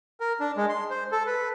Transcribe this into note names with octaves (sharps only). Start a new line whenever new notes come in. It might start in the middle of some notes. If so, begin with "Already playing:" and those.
A#4
D4
G#3
C6
C5
A4
B4